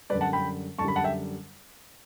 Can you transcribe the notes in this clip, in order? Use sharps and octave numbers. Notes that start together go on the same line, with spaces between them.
F#2 D3 G3 B4 D5
F#5 A5
G5 B5
F#2 D3 G3 A5 C#6
B5
F#5 A5
E5 G5